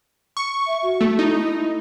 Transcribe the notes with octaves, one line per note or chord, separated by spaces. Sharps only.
C#6
E5
F#4
A3
D#4 E4